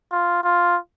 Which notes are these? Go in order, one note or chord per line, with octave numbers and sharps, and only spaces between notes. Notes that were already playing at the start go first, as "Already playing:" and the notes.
F4
F4